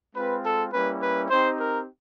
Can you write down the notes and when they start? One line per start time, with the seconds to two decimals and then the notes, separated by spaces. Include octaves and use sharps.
0.14 G#3 C4 F4 B4
0.43 A4
0.72 G3 A#3 C#4 E4 B4
1.02 B4
1.29 C4 D#4 G4 C5
1.58 A#4